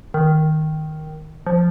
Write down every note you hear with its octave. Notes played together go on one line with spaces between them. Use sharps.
D#3
F3